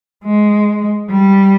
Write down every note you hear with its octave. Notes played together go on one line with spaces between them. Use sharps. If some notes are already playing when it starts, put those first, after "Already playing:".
G#3
G3